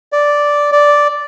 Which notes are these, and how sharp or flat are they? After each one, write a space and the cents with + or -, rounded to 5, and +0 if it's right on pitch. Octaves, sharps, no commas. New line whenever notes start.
D5 -5
D5 -5